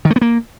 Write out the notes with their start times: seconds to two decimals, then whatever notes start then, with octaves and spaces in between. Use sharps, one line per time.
0.05 D#3
0.10 A3
0.16 B3
0.21 A#3